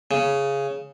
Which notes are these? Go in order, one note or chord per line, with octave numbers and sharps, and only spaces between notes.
C#3